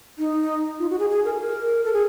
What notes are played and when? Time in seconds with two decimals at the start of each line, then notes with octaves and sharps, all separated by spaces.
0.19 D#4
0.79 F4
0.90 F#4
0.99 G#4
1.09 G#4
1.25 A#4
1.34 A4
1.41 A#4
1.85 A4
1.93 G#4